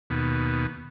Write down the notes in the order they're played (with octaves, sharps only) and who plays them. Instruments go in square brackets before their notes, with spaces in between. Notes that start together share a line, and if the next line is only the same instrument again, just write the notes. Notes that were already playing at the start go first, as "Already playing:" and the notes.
[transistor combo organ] D#2 B2